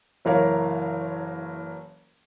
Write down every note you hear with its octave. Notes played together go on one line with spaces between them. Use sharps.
F#1 E3 A#4 C#5 F5